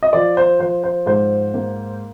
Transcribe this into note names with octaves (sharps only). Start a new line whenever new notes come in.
D#5
F3 D5
C5
F3 C5
C5
G#2 C5
A#3